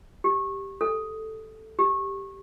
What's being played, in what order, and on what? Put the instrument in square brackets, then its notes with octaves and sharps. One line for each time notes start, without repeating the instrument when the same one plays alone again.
[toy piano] G4
A4
G4